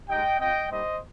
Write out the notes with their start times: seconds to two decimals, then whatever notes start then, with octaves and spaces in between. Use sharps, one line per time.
0.09 G#3 D#4 G4 D#5 G5
0.39 C4 F4 D#5 G5
0.71 G3 A#3 D#4 G4 C5 D#5